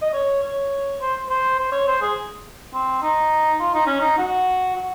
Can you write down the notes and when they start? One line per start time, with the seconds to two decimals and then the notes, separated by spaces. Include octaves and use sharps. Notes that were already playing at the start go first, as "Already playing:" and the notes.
0.02 D#5
0.14 C#5
0.42 C#5
1.01 C5
1.30 C5
1.59 C5
1.72 C#5
1.88 C5
2.02 G#4
2.74 C4
3.02 D#4
3.60 F4
3.74 D#4
3.87 C#4
4.01 D#4
4.18 F#4
4.76 F#4